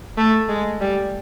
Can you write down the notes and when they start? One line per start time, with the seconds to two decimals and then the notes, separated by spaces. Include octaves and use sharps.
0.17 A3
0.49 G#3
0.81 G3